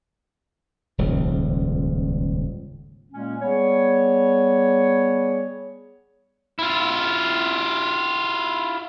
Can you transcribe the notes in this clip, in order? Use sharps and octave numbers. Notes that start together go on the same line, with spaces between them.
D#1 C#2 G#2 F3
A#2 G#3 A#3 C#4
G3 B3 G#4 C#5
E4 F4